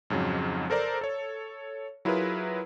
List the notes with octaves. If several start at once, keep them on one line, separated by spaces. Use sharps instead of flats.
F2 G#2 C#3 F#3
A4 A#4 C5 D5 A#5
A4 C#5
F#3 E4 F4 G#4 A#4 B4